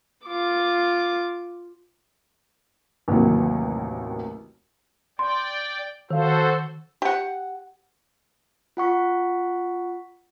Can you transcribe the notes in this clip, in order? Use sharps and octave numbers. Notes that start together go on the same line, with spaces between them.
F4 D6
A1 D#2 C3 D#3 F#3
D5 G5 C6
D#3 F#4 A4 C5 F5
G4 F#5
F4 F#5 C#6 B6